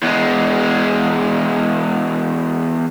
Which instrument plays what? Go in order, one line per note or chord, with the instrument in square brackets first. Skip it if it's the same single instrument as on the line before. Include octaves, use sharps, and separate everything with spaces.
[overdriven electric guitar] E2 G#3